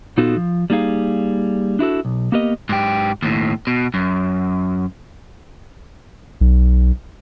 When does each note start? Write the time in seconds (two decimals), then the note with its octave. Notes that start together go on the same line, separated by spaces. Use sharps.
0.17 A#2 B3 D#4 F4 F#4 A4
0.37 F3
0.70 G3 A#3 D#4 G#4 F5
1.79 D4 E4 F#4 A4
2.05 B1
2.32 A#3 B3 G4 A#4 D#5
2.69 G#2 G4
3.22 D#2 A2
3.67 B2
3.94 F#2
6.41 B1